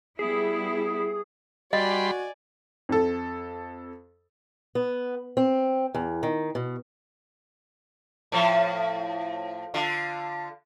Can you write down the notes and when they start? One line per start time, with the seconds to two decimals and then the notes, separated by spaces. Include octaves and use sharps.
0.19 G3 B3 E4 G#4
1.73 G3 F#4 D5 D#5 G#5 B5 C6
2.89 F2 A4
4.75 B3
5.37 C4
5.95 E2
6.23 D#3
6.55 B2
8.32 A2 F3
9.74 D3 F4